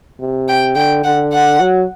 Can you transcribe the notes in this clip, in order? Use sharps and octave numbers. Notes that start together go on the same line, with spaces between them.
C3
G5
D3 G5
D3 F#5
F#5
F#3